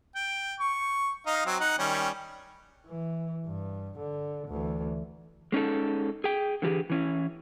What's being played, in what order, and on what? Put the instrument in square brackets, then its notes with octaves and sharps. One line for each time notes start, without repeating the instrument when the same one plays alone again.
[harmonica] G5
C#6
D#4 D#5 F5
F#3 C4
D#4 F#5
D#3 G3 C#4
[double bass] E3
G2
D3
D2 E3
[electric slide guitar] G#3 C#4 D#4 A4
G#4 G5
D3 E3 G4 G#4
E3 C#4 E4